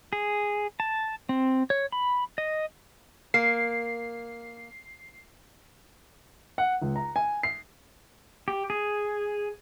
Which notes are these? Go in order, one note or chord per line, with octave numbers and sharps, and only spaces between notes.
G#4
A5
C4
C#5
B5
D#5
A#3 C7
F#5
C#2
A#5
G#5
C7
G4
G#4